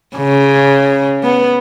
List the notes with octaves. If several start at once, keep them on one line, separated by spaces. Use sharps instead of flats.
C#3
B3